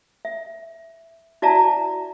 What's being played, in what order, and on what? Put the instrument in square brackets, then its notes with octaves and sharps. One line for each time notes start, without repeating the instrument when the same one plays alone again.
[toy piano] E5
E4 F#4 D5 E5 A5 A#5